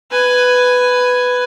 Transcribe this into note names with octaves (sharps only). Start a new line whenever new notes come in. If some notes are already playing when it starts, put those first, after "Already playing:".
B4 G#5